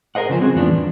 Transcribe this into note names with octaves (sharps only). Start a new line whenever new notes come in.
G#4 A#4 C5 D#5 F#5
C#3 F3 A3 C5 G#5
G3 C4 F#4 G#4
F2 A2 E3 F3 B3 D4
E2